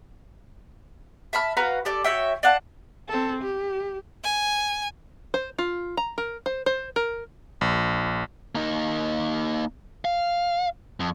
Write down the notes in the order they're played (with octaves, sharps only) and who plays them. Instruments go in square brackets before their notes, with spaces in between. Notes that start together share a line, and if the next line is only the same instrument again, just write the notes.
[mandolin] E5 A5 B5 F6
F#4 B4 F5 A#5
G4 A4 D5
F#4 C#5 E5 G5
D5 F5 F#5 A5
[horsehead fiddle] C4 A4
G4
[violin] G#5
[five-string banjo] C5
F4
A#5
A#4
C5
C5
A#4
[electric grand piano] A#1
[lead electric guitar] A#3 D#4
F5
F2